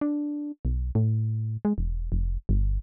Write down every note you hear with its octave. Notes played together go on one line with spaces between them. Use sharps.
D4
B1
A2
G#3
E1
F1
G1